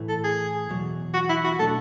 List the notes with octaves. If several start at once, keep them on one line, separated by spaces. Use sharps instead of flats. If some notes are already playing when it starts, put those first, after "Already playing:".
Already playing: A2 E3 A3 E4
A4
G#4
E2 B2 F#3
F#4
E4
F#4
B2 A3 D4 A4